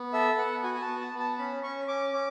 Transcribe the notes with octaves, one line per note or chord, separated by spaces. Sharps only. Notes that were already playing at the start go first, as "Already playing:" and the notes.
Already playing: B3
A4 E5
B3 F#5
F#4 G#5
G#5
A5
B3
A5
B3
A5
C#4 B5
C#4 C#6
C#4 D6
C#4 D6